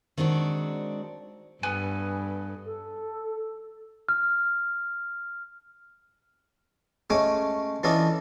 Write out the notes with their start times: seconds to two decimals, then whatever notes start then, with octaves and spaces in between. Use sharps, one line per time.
0.17 D#3 G#3 C4 D4 F#4
1.63 G2 B3 A4 G#5
2.66 A4
4.09 F6
7.10 G#3 A3 C#4 C#5 G#5 D6
7.83 E3 C#4 D4 F4 A4 D#5